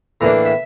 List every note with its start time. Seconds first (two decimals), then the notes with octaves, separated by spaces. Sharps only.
0.21 A2 E3 A#3 D4 A#5
0.45 E5